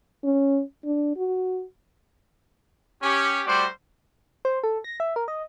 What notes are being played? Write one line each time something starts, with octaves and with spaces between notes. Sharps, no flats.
C#4
D4
F#4
C#4 G4
G3 A3 F#4 C5 D5
C5
A4
A#6
E5
A#4
D#5